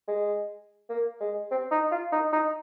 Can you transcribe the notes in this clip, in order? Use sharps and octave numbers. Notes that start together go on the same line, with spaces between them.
G#3
A#3
G#3
C4
D#4
F4
D#4
D#4